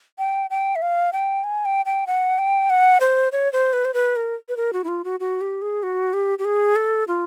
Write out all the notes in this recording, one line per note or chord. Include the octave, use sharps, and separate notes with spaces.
G5
G5
E5
F5
G5
G#5
G5
G5
F#5
G5
F#5
C5
C#5
C5
B4
C5
B4
A#4
B4
A#4
F#4
E4
F4
F#4
F#4
G4
G#4
F#4
G4
G4
G#4
A4
F4